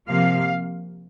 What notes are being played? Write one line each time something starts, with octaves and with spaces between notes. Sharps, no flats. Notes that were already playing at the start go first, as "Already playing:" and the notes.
C3 F3 A#3 F5